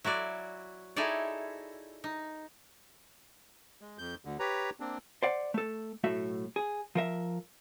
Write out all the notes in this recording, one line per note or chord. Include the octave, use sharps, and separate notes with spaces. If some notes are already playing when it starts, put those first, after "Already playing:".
F#3 E4 F#4 D5
D#4 E4 G#4 A4 C#5 D5
D#4
G#3
F2 G6
D2 D3
G4 B4 C#5 A#5
A#3 C4 D4
C5 D5 F#5
A3 A4
B1 A2 A3 F#4 E5
G#4
F3 A#4 E5